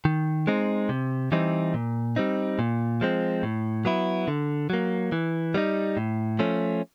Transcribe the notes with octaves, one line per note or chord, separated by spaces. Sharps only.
D#3
G#3 C4 D#4
C3
E3 G3 C4 D#4
A#2
G3 C4 D#4
A#2
F3 G#3 C4
A2
F#3 B3 E4
D3
F#3 A#3
E3
G3 B3 D#4
A2
F3 A3 C#4